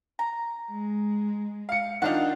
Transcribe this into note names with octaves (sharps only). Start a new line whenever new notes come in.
A#5
G#3
F5 C#7
D#3 D4 D#4 F4 F5 F#5